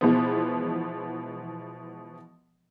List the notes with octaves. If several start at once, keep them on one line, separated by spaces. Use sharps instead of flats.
B2 E3 F3 G#3 B3